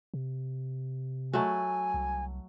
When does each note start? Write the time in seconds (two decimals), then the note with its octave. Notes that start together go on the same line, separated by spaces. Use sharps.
0.14 C3
1.33 F#3 A3 G#5
1.94 C2